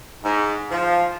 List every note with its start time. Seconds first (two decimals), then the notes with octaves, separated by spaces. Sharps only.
0.24 G#2
0.71 F3